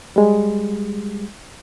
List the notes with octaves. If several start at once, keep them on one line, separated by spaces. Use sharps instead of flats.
G3 G#3